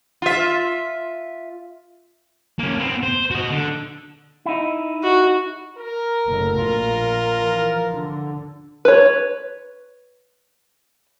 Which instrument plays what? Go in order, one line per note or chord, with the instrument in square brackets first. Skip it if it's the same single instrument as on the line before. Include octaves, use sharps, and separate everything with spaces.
[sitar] F4 E5
[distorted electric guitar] A#3 C#4
B3 C4
C5
F#4 D#5
D3
[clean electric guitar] D#4 E4
[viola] F#4
[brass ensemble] A#4
[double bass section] F#1 B2 A3
[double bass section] A#1 [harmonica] F4
[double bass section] E3 F3
D3
[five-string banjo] B4 C#5